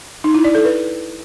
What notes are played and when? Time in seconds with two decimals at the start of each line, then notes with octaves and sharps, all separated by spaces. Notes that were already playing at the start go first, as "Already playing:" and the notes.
0.24 D#4
0.34 E4
0.45 D5
0.55 A4
0.65 B4